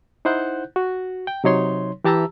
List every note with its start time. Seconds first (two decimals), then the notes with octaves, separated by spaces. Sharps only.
0.25 D#4 E4 C5 F#5 F#6 G6
0.76 F#4
1.27 G5
1.44 C3 F#3 D#4 C#5 C6
2.04 E3 G4 A5 A#5 E6